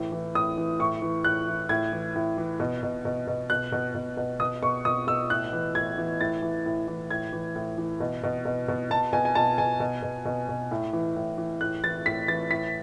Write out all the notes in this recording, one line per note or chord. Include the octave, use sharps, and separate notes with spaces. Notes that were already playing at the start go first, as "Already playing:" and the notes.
Already playing: A2 E3
E3
A2 D#6
E3
A2 C#6
E3
A2 F#6
E3
A2 G#6
E3
A2
E3
B2
B2
B2
B2
B2 F#6
B2
B2
B2
B2 D#6
B2 C#6
B2 D#6
B2 E6
A2 F#6
E3
A2 G#6
E3
A2 A6
E3
A2
E3
A2 G#6
E3
A2
E3
B2
B2
B2
B2
B2 A5
B2 G#5
G#5
B2 A5
B2 G#5
B2
B2
B2
B2
A2
E3
A2
E3
A2 F#6
E3 A6
A2 B6
E3 A6
A2 B6